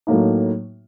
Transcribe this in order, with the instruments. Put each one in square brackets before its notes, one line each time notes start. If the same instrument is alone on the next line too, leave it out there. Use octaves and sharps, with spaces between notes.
[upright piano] A2 F#3 A#3 D#4